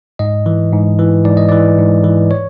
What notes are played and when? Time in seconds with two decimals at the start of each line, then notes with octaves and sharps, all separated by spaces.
0.19 G#2 D#5
0.46 E3
0.72 G#2
0.99 E3
1.25 G#2 D5
1.37 D#5
1.49 E3 D5
1.78 G#2
2.04 E3
2.31 C#5